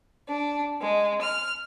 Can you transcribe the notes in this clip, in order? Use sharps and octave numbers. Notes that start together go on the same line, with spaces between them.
D4
G#3
F6